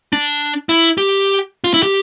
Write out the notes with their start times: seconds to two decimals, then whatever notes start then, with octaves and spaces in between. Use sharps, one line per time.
0.13 D4
0.69 E4
0.98 G4
1.64 F4
1.74 E4
1.83 G4